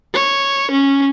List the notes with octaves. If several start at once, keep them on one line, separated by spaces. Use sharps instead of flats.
C#5
C#4